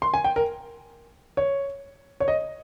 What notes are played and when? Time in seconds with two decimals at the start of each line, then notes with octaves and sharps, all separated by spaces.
0.02 C6
0.14 G#5
0.24 G5
0.36 A#4
1.37 C#5
2.20 C#5
2.28 D#5